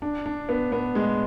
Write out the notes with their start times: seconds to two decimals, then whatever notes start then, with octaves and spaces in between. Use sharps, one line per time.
0.02 D4
0.26 D4
0.49 B3
0.72 B3
0.95 G#3